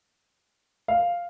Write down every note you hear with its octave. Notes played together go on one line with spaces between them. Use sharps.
F5